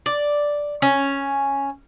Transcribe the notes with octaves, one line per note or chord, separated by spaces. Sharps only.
D5
C#4